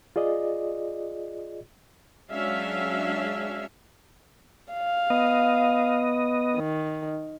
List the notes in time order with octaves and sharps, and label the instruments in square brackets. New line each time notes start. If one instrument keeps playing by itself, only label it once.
[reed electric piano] F4 G#4 D5 D#5
[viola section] F#3 G#3 C#4 D4 E5 F5
[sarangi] F5
[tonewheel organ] B3 D#5
[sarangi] D#3